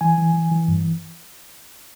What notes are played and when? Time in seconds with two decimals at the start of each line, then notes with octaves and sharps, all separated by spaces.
0.01 E3 G#5
0.18 E3
0.34 E3
0.51 E3
0.68 G2